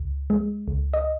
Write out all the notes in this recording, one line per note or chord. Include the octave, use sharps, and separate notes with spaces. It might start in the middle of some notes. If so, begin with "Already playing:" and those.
Already playing: C#2
G#3
C#2
D#5